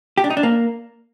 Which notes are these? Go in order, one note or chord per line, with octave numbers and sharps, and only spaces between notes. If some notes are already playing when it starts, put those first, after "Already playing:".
G4
D4
D#4
D4
A#3